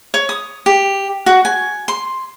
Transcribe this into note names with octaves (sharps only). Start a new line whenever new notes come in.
C#5
D#6
G4
F#4
G#5
C6